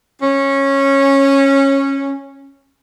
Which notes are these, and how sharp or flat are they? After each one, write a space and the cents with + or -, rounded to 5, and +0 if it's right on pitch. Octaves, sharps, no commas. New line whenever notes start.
C#4 -15